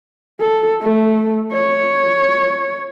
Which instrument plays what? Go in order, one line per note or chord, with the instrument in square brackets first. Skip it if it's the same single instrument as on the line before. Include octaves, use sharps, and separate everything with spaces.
[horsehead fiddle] A4
A3
C#5